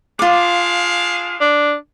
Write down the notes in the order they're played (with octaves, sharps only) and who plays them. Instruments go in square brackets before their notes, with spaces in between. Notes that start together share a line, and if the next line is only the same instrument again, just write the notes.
[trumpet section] D4 G#4 F5 [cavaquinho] F4 D6
[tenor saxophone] D4